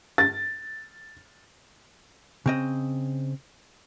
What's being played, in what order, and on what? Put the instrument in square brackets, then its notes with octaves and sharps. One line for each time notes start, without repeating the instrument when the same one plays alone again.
[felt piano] A6
[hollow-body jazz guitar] C#3 C4 D#5